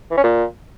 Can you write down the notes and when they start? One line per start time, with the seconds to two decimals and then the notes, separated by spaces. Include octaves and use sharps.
0.11 E3
0.17 C#4
0.24 A#2